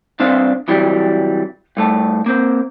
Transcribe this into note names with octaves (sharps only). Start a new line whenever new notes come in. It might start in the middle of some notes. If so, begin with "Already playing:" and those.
C2 C4 D4 C5 F5
C3 E3 F#3 G3
G2 A3 A5
A#3 C4